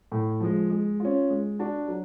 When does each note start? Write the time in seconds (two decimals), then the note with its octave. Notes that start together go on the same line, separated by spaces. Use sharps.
0.12 A2
0.40 F3 G#3
0.70 G#3
1.00 C#4 F4
1.30 G#3
1.59 D4 F#4
1.88 F#3